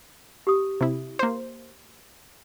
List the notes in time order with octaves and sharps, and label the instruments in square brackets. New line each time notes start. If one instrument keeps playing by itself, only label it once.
[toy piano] G4 D#6
[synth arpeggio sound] C3 E4
A#3 C5